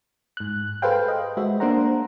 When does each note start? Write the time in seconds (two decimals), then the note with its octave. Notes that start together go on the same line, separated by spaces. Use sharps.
0.37 G#2 F#6
0.82 G#4 A4 B4 C5 F5 G5
1.08 D#5
1.37 G#3 F#4 C5 E5
1.60 A#3 D4 A#4 C5 F#5 A#5